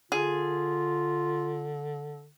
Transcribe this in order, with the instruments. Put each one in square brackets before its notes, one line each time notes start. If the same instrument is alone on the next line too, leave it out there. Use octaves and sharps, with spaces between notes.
[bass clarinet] D3 [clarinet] F4 [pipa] G#4